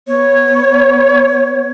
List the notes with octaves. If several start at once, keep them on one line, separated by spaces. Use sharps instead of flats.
B3 C#5